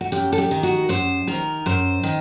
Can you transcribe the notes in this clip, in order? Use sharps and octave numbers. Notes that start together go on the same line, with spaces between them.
F#4
F#2 G4
A4
G4
D#3
F#4
F#2 C5
D#3 A#4
F#2 C5
D#3